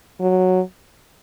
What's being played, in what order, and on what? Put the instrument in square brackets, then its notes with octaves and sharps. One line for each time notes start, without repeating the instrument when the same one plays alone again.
[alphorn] F#3